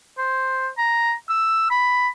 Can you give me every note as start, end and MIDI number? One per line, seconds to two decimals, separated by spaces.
0.18 0.69 72
0.78 1.13 82
1.30 1.69 88
1.70 2.09 83